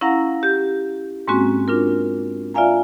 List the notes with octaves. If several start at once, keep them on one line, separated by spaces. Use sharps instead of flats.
C#4 E4 F5 F#5 A#5 A#6
G4 G6
G#2 G#3 A#3 C4 C#4 F#4
D4 F4 A#4
F4 D5 E5 F5 G#5 A#5